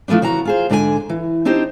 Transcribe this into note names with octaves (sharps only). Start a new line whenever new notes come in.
E3 F3 A3 B3 D4
C#3 E3 F#4 F#5 A#5
F4 G#4 C5
G#2 D3 D4 G#4 G#5
E3
C4 D4 D#4 G4 C5